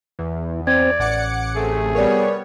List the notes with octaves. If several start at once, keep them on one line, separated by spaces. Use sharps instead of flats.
E2 E3
C4 D5 G#6
A1 F#5 D6 C#7
C3 A3 G#4
G3 B3 A#4 C#5 D5